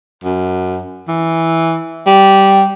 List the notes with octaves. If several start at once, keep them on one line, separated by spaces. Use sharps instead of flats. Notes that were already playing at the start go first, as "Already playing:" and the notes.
F#2
E3
G3